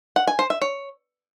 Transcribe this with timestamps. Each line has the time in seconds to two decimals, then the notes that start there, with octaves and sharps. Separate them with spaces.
0.16 F#5
0.27 G#5
0.39 C5
0.50 E5
0.62 C#5